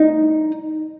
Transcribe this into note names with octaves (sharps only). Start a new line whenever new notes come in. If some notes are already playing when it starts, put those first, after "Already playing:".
Already playing: D#4